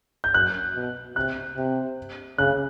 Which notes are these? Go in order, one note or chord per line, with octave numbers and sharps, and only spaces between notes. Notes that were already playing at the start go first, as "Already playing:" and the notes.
G6
F#2 F#6
B2
C3 F#6
C3
C#3 F#6